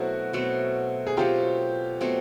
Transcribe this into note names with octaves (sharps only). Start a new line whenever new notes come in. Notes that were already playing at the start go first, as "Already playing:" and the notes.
Already playing: B2 F#3 A3 C4 E4 F#4
B2 F#3 A3 C4
G#4
B2 F#3 A3 C4 F4 G4
B2 F#3 A3 C4